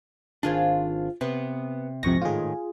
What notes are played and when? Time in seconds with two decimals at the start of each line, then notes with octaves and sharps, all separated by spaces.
0.43 G#1 D#3 D4 F4 G#4 C5
1.21 C3 B3
2.03 C2 F2 G#2 C3 C#6 A#6
2.22 A2 D#3 F4 G#4